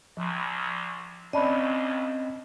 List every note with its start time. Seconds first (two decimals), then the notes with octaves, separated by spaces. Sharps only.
0.17 C2 F3
1.33 C2 F2 C4 C#4 D5 D#5 A5 B5